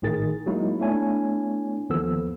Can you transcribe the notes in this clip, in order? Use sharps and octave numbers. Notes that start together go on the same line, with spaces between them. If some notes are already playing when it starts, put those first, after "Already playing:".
G#1 A2 D#3 G#4 A6
F#3 G#3 A#3 D#4 E4 F#4
A3 B3 D4 E4 C#5 G#5
D#2 E3 F3 B3 A4 E6